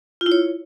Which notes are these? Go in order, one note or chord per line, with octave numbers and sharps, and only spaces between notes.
F4
E4
C#5